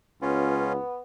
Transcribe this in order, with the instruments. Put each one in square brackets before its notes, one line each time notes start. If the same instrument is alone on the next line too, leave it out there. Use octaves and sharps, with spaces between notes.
[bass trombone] C#2 [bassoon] B3 [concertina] C#4 F4